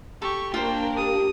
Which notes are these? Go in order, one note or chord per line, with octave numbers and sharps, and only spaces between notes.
G4 A4 C#6
A#3 D4 F4 A#4 C5 G5
G4 D#6